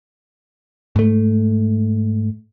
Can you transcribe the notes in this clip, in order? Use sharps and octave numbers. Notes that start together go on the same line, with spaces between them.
G#2 A3